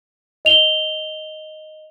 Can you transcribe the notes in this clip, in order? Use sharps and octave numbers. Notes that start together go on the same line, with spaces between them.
D#5 F7 G7